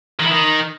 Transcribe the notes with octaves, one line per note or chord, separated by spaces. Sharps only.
D#3
E4
D#3